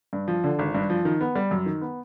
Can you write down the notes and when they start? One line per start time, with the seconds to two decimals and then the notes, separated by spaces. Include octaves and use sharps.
0.13 G2
0.28 F3
0.44 D3
0.59 G#1
0.75 G2
0.90 F3
1.05 D#3
1.21 B3
1.36 G3
1.51 F#2
1.66 D#3
1.82 B3